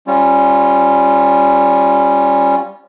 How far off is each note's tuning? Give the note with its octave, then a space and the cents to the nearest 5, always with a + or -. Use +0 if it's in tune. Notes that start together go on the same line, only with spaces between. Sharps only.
G3 +0 C#4 -15 F4 -10